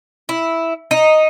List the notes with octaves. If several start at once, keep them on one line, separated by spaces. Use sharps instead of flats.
E4
D#4